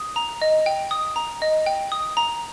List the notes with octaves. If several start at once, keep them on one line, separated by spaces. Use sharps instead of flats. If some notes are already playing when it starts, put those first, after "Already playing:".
Already playing: D#6
A#5
D#5
G5
D#6
A#5
D#5
G5
D#6
A#5